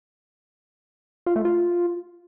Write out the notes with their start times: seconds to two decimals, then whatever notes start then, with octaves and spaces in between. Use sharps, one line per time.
1.26 F4
1.36 A3
1.45 F4